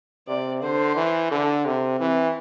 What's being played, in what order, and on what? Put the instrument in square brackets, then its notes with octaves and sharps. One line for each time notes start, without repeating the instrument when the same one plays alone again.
[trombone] C3 [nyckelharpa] D5
[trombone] D3 [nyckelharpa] C5
[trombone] E3
[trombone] D3 [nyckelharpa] A4
[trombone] C3
[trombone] E3 [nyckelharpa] C4